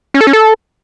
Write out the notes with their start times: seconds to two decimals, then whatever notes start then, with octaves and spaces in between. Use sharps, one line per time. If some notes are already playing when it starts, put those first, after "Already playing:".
0.14 C#4
0.21 A4
0.27 C#4
0.33 A4